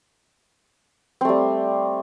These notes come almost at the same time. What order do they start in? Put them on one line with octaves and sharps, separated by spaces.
C4 A3 G3